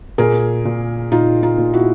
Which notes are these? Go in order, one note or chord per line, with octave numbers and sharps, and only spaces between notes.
A#2 G#4 A#4
A#2
A#2 D#4 F4
D#4 F4
A#2
E4 F#4